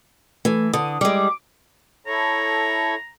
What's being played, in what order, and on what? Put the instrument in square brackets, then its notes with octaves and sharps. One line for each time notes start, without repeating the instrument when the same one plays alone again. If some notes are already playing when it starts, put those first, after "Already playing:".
[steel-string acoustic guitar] E3 [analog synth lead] A3
[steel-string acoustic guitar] D3 [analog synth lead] D#6
[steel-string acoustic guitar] G3 G#3 [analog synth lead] D6
[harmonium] E4 A4 C#5 [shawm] A#5